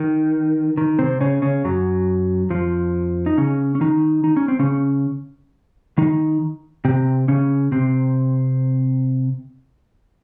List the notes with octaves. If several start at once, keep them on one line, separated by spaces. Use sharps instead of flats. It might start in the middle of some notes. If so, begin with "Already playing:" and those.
Already playing: D#3
D#3
C3 C4
C#3 C#4
C#3 C#4
F#2 F#3
F2 F3
D#4
C#3 C#4
C#4
D#3 D#4
D#4
C#4
C4
C#3 C#4
D#3 D#4
C3 C4
C#3 C#4
C3 C4